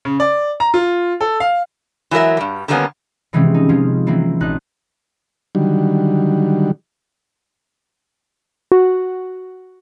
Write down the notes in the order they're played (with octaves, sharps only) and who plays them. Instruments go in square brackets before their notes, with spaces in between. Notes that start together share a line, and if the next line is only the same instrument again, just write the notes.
[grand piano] C#3
D5
A#5
F4
A4
F5
[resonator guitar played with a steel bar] E3 F#3 G#3 A#4 E5
G2 G3
D3 D#3 G3 A#3 B3 C#4
[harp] C3 E3 F3 G#3 C4 C#4
D#4
F3 G#3 C#4 F4
E3 F#3 A#3 C4
A#1 D#4 F#6
[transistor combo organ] D3 D#3 F#3 G3
[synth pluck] F#4